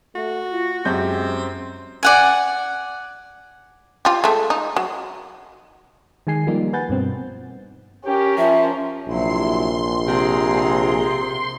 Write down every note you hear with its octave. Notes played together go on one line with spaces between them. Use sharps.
A3 F#4
F4
F#2 G#3 C4 G4 G6
D5 F#5 G#5
F4 G4
G#3 A3
D#4
F#3
D#3 G#3 G#5 C7
F3 G3 A#3 D#4 G4
B4 F#5 G#5 G6 A6
G2 B2 C4
C#4 G4 A#4
F3 E5
A#1 C3 F#3 E4 C6
C3 G#4 A#5